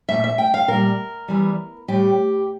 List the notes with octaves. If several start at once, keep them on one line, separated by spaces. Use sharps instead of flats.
A#2 A3 E5
E5
G5
F5
A#2 G3 A#4
E2 E3 G3
A2 G3 G4